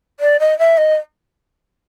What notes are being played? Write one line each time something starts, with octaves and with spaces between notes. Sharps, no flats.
D5
D#5
E5
D#5